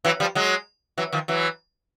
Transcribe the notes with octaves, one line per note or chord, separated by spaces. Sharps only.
E3 F#3
F3 G3
F#3 G#3
E3 F#3
D#3 F3
E3 F#3